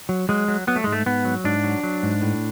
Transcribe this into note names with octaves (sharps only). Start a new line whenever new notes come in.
F#3
F#3 G#3
F#3
F#3 B3
A3
G#2 G#3
A3
G#2 B3
F#3
G#2 D4
F#3
F#3
G#2
A2